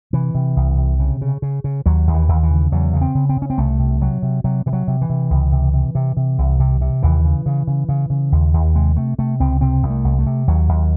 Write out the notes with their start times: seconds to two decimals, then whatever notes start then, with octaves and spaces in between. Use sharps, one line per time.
0.13 C3 E3
0.35 C3
0.56 C2
0.78 C3
0.99 C#3
1.21 C#3
1.42 C#3
1.64 C#3
1.86 D#2 F#3
2.07 D#2
2.14 E3
2.29 D#2
2.43 E3
2.51 C#3
2.72 E2 F#3
2.94 C#3
3.01 C4
3.15 C#3
3.29 C4
3.37 C#3
3.42 C#4
3.50 C4
3.58 C2 A3
3.80 C3
4.01 C3 F#3
4.22 C3
4.44 C3 F#3
4.66 C3 E3
4.73 F#3
4.88 C3
5.02 E3
5.10 C3
5.30 C#2
5.52 C3
5.74 C3
5.95 C3
6.17 C3
6.38 C2
6.60 C3
6.81 C3
7.03 D#2 E3
7.25 C#3
7.46 C#3
7.67 C#3
7.89 C#3
8.10 C#3
8.32 D#2
8.54 D#2
8.75 C3 G#3
8.97 C3 A3
9.18 C3 A3
9.40 C#2 C4
9.61 C3 C4
9.83 C2
9.90 A3
10.04 C2
10.19 A3
10.26 C3
10.48 D#2 F#3
10.69 D#2